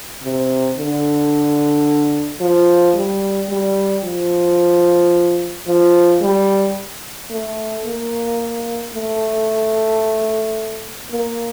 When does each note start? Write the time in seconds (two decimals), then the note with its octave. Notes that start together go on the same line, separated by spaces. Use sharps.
0.23 C3
0.77 D3
2.40 F3
2.95 G3
3.49 G3
4.04 F3
5.67 F3
6.21 G3
7.30 A3
7.85 A#3
8.94 A3
11.11 A#3